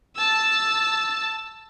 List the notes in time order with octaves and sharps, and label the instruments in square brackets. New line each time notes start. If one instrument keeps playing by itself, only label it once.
[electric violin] A5 E6